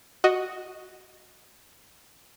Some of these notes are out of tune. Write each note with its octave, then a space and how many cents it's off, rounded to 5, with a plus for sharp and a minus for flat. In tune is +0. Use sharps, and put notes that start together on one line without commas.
F#4 +0 D#5 +0